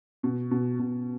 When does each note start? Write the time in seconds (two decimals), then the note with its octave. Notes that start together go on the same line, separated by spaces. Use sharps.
0.23 B2
0.51 B2
0.79 B2